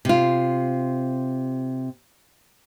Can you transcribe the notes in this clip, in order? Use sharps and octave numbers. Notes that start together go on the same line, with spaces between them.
C3 F4